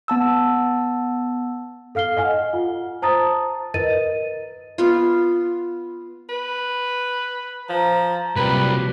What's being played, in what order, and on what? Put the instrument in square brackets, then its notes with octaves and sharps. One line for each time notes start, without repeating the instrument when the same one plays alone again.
[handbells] B3 A5 E6
[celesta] A4 F5 F6 C7 G7
D#5 F#5 G#5 F6
F4
C5 A5 A#5 D#6 A6
A#4 B4 D#5 A6 D#7
[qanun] B3 F4
[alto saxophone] B4
[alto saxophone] F3 [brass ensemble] A#5
[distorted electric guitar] C2 [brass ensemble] A#2 F#3 G3 [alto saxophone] B4